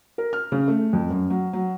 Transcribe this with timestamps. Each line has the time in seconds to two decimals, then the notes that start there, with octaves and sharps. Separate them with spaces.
0.18 A#4
0.33 F6
0.52 C#3
0.68 A3
0.93 F2
1.10 F#2
1.30 F#3
1.53 F#3